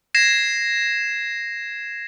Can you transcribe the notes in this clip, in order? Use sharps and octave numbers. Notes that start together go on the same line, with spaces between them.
G#6 A#6 C7 E7